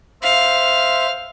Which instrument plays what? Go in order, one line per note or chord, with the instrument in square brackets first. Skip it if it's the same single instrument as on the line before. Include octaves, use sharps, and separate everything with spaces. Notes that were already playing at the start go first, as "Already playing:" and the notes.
[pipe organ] C5 E5 [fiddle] F5